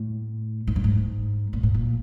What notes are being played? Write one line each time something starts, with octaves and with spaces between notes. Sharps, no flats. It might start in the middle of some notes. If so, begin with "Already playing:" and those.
Already playing: A2
G#2
G2
G#2
A#2
A2
A#2